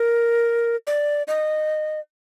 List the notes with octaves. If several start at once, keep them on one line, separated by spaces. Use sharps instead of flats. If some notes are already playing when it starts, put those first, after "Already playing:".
Already playing: A#4
D5
D#5